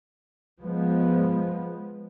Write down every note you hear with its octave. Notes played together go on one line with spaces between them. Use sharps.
F3 G#3 B3